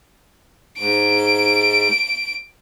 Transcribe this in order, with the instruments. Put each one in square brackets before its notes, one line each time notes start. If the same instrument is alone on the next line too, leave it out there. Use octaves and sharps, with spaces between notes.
[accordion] G#2 [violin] D7